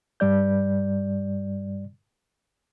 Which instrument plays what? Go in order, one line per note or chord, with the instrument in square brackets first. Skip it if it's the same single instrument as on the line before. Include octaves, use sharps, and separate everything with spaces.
[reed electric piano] G2 G3 D5 G6